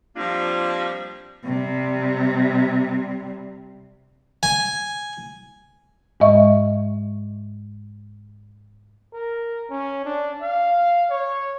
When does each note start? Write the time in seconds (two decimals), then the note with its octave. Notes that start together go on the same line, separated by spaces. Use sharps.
0.16 F3 G3 A#3 C4 D4 F4
1.45 C3 G3
4.43 G#5
6.20 G#2 G#3 D#5 E5 C#6
9.13 A#4
9.70 C#4
10.05 D4
10.41 F5
11.10 C#5